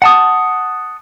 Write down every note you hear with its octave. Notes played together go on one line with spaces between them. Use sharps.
F#5 A5 D#6